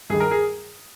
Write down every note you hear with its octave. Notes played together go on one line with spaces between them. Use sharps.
G2 D#3 G#4
A#4
G#4